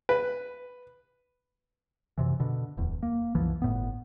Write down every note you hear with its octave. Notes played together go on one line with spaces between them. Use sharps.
B4
F#2 C3 E3
B2 D3
D1 E2
A#3
C2 F#2 E3 F3
G1 A2 B3